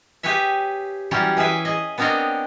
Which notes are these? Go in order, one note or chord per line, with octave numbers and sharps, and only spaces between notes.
G4 G#4 B4 C#5 E5
E3 F#3 G3 C#4 F4
E3 G#4 B4 E5
G#4 D#5
B3 C4 D4 A#4 C#5 D#5